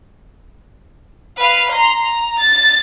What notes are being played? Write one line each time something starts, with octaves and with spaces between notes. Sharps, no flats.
B4 F5
A#5 C6
A#5
A6